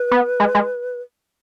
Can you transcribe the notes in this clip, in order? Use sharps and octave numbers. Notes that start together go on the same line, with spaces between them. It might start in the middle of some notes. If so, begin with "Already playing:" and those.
Already playing: B4
B3
G#3
G#3